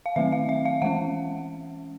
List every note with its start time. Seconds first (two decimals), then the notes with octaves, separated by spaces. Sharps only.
0.06 F5
0.16 D#3 F#3 A3 C4 E5
0.32 F5
0.49 E5
0.65 F5
0.82 E3 G#3 C#4 F#5